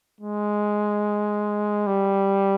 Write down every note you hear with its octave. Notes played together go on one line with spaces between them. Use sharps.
G#3
G3